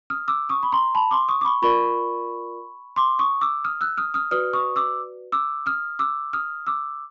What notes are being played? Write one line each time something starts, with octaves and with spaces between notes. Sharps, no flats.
D#6 F6
D6 E6
C#6 D#6
B5
A#5 C6
A5 B5
C6 D6
C#6 D#6
D6
B5 C#6
F4 A#4 D5 B5 C#6
C6 D6
C#6 D#6
D6 E6
D#6 F6
E6 F#6
D#6 F6
D#6 F6
F#4 B4 D5 D#6 F6
C#6 D#6
D6 E6
D6 E6
D#6 F6
D6 E6
D#6 F6
D6 E6